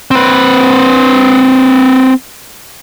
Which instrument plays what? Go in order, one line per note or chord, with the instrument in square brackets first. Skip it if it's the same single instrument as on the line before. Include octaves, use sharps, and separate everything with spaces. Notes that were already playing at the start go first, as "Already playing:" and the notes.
[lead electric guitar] C4 B4